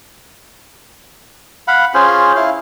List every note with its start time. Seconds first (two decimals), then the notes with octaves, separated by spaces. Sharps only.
1.68 F5 F#5 B5
1.94 C#4 F4 G#4 C5
2.36 E4 F5